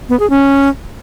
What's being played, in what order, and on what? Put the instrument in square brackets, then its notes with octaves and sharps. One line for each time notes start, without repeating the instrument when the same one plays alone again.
[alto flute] B3
G#4
C#4